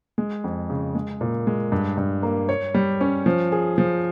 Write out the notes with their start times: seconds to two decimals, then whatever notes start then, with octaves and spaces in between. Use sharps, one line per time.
0.18 G#3
0.44 F2
0.70 C#3
0.95 G#3
1.21 A#2
1.47 G#3
1.72 G2
1.98 G2
2.23 A#3
2.49 C#5
2.74 G3
3.01 C#4
3.26 F3
3.52 G#4
3.78 F3